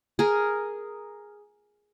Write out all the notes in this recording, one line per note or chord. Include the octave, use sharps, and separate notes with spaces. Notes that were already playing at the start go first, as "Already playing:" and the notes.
G#4 A#4